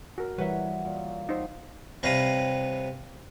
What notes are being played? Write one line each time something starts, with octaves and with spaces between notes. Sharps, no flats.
F#4 A#4
E3 F#3 G3 B4 C#5 E5 F#5
A#2
D#4 C5
C2 C3 B4 C#5 F5 A#5